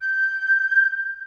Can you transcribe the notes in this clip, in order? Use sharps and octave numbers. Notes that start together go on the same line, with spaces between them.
G6